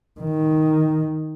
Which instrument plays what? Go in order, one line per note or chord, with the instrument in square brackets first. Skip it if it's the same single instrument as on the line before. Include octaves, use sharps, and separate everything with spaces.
[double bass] D#3